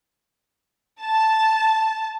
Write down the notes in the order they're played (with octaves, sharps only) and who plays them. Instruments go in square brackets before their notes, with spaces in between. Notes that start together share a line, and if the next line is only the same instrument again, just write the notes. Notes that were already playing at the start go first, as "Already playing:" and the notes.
[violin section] A5